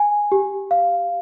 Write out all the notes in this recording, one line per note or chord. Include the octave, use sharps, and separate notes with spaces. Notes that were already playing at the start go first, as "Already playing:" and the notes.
Already playing: G#5
G4
F5